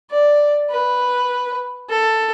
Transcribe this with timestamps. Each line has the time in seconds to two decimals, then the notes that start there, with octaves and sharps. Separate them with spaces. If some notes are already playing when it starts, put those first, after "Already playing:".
0.11 D5
0.70 B4
1.89 A4